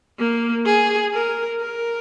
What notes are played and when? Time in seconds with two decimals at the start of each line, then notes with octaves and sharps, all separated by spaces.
0.19 A#3
0.66 G#4
1.14 A#4
1.60 A#4